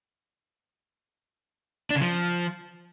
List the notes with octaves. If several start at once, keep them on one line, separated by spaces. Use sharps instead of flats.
D4
C#3
F3